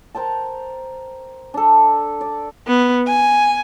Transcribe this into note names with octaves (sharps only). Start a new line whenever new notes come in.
A#4 C5 G5 A5
D4 A4
D5
B3
G#5